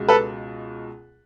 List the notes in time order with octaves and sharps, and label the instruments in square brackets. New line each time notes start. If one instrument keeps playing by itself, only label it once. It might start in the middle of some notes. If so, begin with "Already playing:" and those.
Already playing: [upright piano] C#2 B2 G#3
[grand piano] A4 B4